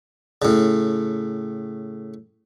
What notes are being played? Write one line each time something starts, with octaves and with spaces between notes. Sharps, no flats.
A2 C#3